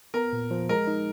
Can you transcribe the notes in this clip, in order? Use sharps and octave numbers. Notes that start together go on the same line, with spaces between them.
B3 A#4
A#2
F3
G#3 A#4
D#4